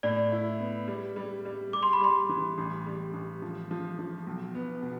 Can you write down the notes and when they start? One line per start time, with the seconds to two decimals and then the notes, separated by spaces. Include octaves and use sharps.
0.03 A2 D5
0.32 E4
0.60 B3
0.88 G3
1.16 G3
1.45 G3
1.73 G3 D6
1.83 C6
1.93 B5
2.01 G3 C6
2.29 E3
2.58 A1
2.86 G3
3.13 A1
3.42 F3
3.71 F3
3.99 F3
4.27 B1
4.55 B3
4.83 B2